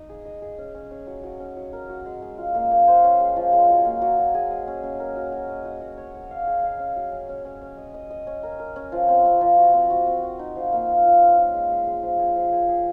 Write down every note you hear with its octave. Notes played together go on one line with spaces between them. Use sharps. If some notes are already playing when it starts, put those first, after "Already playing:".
Already playing: D#4 D#5
G#4
D#5
G#4
C#4
C#4
C#4
F#3
F#3
C#4
F#3
A#4
F#4
G#3
G#3
F4
A#3
A#3
C5
C#4
G#3
F3
G#3
F#3
A#3
F#3
F#3
G#4
D#5
C#4
C#4
A#4
F#4
F#4
D#5
F#4
F#4
C#5
C#5
F5
G#4
F5
C#4
F#3
C#4
C#4
C#4
C#4
D#5
D#5
D#5
C#4
A#4
A#4
C#4
F3
C4
C4
F3
F#4
C4
F#4
C4
F#4
D#4
F3
A#3
F4
F4
C#4
F4
G#3
G#3
G#3
F3
G#4
F3
G#4
G#4